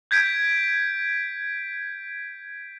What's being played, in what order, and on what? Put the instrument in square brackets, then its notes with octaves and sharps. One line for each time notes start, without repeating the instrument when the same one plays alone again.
[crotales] G6 G#6 B6 D7